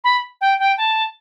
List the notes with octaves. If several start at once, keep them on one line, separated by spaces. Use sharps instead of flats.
B5
G5
G5
A5